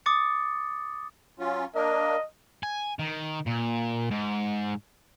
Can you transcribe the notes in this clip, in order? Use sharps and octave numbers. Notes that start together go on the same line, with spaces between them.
D6 D#6 A6 C#7
F#3 C#4 F4
A#3 D4 A#4 D#5
G#5
D#3
A#2
G#2